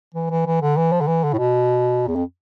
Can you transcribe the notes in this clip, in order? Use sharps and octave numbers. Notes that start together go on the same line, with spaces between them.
E3
E3
E3
D3
E3
F3
D3
E3
D3
A2
B2
E2
F2